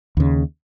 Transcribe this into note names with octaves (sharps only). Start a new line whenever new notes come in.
D#2 C#3